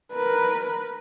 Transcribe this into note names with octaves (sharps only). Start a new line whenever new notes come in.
A#4 B4